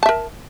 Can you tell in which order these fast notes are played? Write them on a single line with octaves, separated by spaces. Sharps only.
A5 E5 A#4